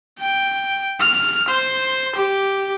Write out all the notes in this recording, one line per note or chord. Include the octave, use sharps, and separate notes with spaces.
G5
F6
C5
G4